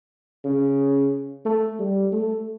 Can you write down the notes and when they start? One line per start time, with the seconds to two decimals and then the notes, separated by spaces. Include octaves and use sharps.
0.44 C#3
1.45 A3
1.79 G3
2.12 A3